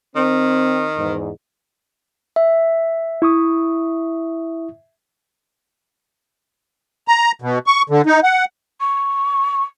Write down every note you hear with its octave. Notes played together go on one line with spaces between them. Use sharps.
D#3 C4
E2 G#2
E5
E4 C#6 D#6
A#5
B2
C#6
D3
D#4
F#5
C#6